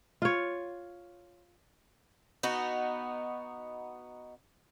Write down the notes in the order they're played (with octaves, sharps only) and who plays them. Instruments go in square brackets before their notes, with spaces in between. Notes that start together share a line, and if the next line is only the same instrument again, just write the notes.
[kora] F4 C#5
[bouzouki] B3 D#4 F#4